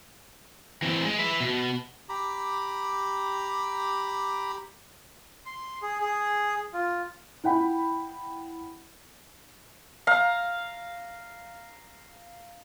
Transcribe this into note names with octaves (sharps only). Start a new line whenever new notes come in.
E3 C4
G#3
B4 E5
B2
G4 A#5 B5 D6
C6
G#4
G#4
F4
E4 F#5 G5 B5
F5 A#5